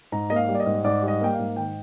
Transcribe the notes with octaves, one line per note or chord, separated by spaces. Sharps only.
G#2 A#5
A#3 D#5
F5
G3
D5
D#5
G#2
G#2 D5
G3
D#5
A#3 G5
F5
G#2
D#3 G5